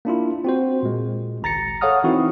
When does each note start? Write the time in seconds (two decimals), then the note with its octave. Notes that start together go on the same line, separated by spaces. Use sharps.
0.05 A#3 D4 E4 F4
0.44 C4 F#4 C5
0.83 A#2 G#3
1.42 G#1 C#2 A#5 A6 A#6 C#7
1.81 A4 C#5 F5 F#5 D#6 F6
2.04 E3 C4 D#4 E4 F#4